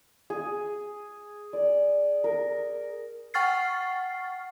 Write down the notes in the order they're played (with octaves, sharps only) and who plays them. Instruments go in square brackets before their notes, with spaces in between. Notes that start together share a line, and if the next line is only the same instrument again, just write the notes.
[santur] G#4
D5
A#4
[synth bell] F#5 G5 C#6 F6 A6 C7